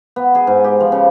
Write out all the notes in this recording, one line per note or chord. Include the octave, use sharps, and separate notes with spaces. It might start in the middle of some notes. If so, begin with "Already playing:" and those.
B3
G#4
G#2
G4
F3
C#3